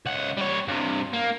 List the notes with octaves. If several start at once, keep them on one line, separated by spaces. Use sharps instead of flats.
C#2 F#5
G3 C#5
G2 C3
A#3